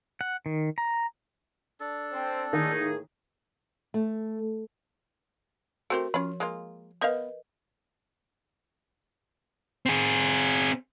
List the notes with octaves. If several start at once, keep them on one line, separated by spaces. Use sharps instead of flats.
F#5
D#3
A#5
D4 A4
C4
A2 D#3 A#3 D#4 G#4
A3
A3 C4 F#4 G4 A#4
F3 C#4 F4 B5
G#3 A#3 F4
B3 A#4 B4 D#5 F5
C4 G#4